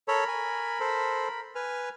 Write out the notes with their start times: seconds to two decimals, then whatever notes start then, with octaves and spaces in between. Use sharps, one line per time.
0.08 A4 A#4 C#5 B5
0.28 G#5
0.80 A4 C5
1.55 B4 G#5 F6